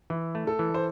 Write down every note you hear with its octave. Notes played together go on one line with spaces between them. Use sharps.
E3 E4
A3
A4
E3
C5